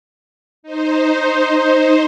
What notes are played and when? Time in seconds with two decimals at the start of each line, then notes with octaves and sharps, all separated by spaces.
0.63 D#4 C5